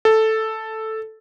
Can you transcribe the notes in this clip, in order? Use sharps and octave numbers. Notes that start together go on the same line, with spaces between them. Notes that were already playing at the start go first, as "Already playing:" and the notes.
A4